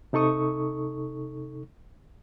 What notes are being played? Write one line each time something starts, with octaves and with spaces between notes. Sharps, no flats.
C3 D#4 A4 C#6 D#6